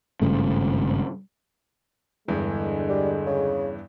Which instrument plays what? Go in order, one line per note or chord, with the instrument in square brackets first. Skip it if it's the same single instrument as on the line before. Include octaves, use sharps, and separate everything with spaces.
[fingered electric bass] G#1 G2 C#3 A3
[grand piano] E2 G2 E3 [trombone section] D3 G#3
[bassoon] G3
C#3